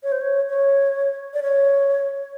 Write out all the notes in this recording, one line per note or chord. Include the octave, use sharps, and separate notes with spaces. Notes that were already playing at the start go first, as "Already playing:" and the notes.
C#5
C5
C#5
C#5
D5
C#5